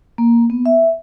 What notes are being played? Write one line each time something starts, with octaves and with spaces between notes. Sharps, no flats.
A#3
B3
E5